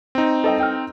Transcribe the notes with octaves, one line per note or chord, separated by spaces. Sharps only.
C4 D#4
A4 D#5 G5
G5 F6